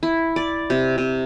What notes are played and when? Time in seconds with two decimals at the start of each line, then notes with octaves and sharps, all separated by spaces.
0.03 E4
0.36 D5
0.70 C3
0.98 C3